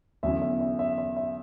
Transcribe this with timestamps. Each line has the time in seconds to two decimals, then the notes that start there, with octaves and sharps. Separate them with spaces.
0.23 E2 D3 F#3 C#4 E4 E5
0.42 E5
0.60 E5
0.79 E5
0.98 E5
1.17 E5